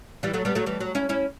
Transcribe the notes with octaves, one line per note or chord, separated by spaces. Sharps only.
E3 G3
F#3 A3
G3 B3
F#3 A3
E3 G3
F#3
C#4 E4
C#4 E4